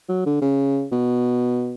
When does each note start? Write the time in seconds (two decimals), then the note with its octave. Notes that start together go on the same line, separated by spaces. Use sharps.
0.09 F#3
0.26 D3
0.41 C#3
0.92 B2